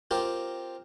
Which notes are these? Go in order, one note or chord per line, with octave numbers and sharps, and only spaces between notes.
C4 F4 G4 A#4